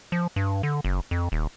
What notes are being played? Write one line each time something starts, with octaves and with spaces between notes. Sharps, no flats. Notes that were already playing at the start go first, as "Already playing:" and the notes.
F3
G2
D3
F#1
F2
D#1